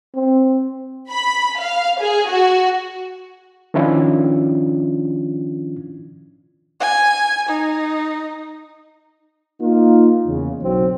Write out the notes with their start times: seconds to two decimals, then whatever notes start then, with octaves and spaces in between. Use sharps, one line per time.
0.15 C4
1.10 B5
1.59 F5
2.00 G#4
2.30 F#4
3.74 D#3 F3 C#4 D4 E4 F4
6.80 G#5
7.48 D#4
9.61 A#3 D#4 F4
10.27 E2 C#3
10.63 B1 C4